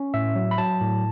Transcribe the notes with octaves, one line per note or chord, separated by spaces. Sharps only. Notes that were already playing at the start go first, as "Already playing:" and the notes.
Already playing: C#4
A2 E5
F#3
B5
F#3 A5
A2